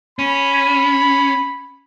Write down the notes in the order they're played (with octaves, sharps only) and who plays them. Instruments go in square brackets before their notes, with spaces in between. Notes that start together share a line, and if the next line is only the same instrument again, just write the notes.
[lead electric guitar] C#4 [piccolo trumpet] B5